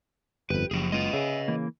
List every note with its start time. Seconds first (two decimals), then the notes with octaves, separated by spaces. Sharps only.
0.50 G1 F2 G4 B4
0.71 F#1 F3 G#4
0.92 G#3 C#4 F4 B4 D#5
1.13 C#3 G#4 E5
1.48 E3 A#3